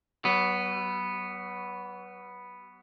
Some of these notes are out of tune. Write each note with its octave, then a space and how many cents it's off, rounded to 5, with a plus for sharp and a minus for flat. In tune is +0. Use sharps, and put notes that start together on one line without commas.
F#3 +40 B3 +0